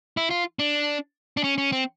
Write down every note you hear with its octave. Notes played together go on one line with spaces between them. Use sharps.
E4
F4
D4
D4
C#4
C#4
C4